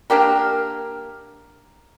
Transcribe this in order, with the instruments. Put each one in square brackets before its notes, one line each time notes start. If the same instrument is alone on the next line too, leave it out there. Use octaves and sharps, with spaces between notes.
[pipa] A#3 D4 G4 A#4